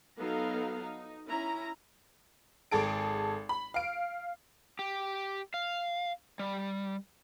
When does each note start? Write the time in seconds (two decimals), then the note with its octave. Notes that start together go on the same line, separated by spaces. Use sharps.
0.18 F#3 B3 D#4 A4 F5 A#5
0.81 D#4
1.26 C#4 E4 A#5
2.71 G#1 G#4 A4 D7
3.49 B5
3.74 F5 D7
4.79 G4
5.54 F5
6.39 G3